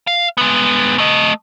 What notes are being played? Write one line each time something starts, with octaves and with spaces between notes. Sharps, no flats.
F5
G#3 B3
A3 D#5